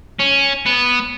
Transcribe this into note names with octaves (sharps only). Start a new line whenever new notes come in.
C#4
B3